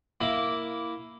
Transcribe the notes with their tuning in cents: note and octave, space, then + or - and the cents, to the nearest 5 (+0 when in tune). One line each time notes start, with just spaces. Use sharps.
A#3 +0 E4 +0